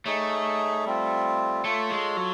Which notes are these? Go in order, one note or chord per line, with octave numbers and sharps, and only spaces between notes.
A3 D#4 G#4 C#5
G3 C4 F4
A3 F4 A4 C#5
G#3
F#3